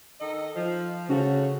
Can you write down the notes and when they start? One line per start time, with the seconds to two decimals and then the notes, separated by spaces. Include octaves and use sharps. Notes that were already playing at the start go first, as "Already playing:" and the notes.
0.20 D#3 A4 D#5
0.55 F3
1.09 C#3 A3 C#4 F#4